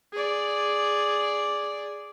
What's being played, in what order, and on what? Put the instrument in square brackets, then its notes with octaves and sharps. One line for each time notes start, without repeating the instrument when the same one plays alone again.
[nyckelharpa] G#4 D5